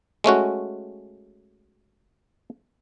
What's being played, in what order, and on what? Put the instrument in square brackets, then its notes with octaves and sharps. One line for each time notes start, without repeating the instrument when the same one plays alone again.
[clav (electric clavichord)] G#3 A3 C#4 F#4